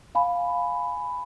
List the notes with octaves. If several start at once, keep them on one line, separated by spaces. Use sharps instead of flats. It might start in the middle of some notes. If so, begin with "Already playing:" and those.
F5 G#5 B5